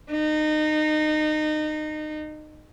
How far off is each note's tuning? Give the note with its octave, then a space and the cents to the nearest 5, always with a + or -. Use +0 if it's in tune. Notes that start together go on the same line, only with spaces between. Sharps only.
D#4 -25